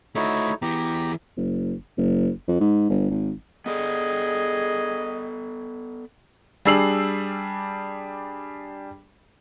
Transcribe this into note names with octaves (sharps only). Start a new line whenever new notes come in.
A3 D#4 E4 F#4 C#5
E3 B3 G4 A#5
F#1
F#1
F2
G#2
G1
G#1
B3 G#4 A4 D5 D#5
G3 D4 G#4 E6 C7 F#7